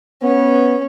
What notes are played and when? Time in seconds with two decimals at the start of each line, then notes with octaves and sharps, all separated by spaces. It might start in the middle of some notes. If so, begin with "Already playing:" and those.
0.23 B3 C#4